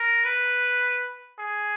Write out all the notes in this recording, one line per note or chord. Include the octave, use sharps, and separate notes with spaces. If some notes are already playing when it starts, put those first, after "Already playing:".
Already playing: A#4
B4
G#4